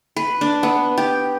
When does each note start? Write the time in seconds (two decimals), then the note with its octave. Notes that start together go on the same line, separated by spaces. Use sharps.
0.16 B4
0.41 D4
0.63 B3
0.98 G4